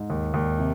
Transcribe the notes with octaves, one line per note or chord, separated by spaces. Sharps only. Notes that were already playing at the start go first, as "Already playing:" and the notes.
Already playing: G#2
D#2
D#2
C3